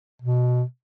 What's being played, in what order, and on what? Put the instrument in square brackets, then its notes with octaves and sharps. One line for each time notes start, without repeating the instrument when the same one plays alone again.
[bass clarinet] B2